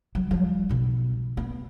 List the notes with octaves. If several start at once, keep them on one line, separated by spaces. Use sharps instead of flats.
F#3
F3 G3
B1 B2
B3